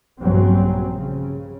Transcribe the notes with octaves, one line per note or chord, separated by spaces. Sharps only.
A#1 G2 C#3 F#3 C4
C#3